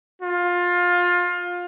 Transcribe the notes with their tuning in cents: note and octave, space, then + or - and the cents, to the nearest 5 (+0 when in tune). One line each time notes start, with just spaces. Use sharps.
F4 +20